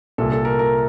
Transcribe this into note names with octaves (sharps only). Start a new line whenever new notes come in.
C2 A#2 A4
A4
A#4
A#4